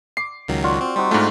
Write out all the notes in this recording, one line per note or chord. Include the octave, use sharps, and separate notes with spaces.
D6 C7
C#2 D#3 F#3
F4 F#4 D5
C4
G3 C4 D#4 F#4
G#2 A3 D4 F4 B5